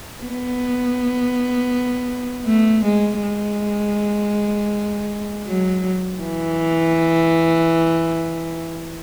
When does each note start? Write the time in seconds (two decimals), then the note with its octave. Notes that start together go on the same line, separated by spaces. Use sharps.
0.22 B3
2.47 A3
2.85 G#3
3.22 G#3
5.47 F#3
6.22 E3